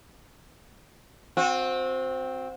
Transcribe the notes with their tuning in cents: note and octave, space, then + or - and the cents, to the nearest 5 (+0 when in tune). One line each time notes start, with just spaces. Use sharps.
C4 +0 F#4 -40